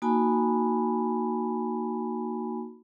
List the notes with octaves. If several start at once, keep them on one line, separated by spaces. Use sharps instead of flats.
A#3 D#4 F#4 G#5 A5 B5